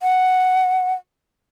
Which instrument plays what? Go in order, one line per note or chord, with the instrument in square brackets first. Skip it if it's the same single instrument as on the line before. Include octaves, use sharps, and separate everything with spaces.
[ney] F#5